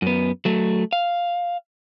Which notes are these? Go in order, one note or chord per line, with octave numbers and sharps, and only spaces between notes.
F#2 B3
F#3 A3
F5